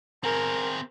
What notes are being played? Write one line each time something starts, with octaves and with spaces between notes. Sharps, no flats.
C4 G#4 A#4